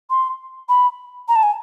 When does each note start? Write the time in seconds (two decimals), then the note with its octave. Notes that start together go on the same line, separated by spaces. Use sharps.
0.10 C6
0.69 B5
1.28 A#5
1.36 A5
1.43 G#5